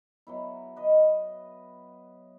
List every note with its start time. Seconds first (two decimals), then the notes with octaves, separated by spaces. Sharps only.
0.27 F#3 B3 E4
0.76 B4 D#5